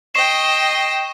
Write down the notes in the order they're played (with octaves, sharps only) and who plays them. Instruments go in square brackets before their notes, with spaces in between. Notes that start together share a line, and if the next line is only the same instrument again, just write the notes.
[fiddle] D#5 G5 [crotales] C#6 C7 E7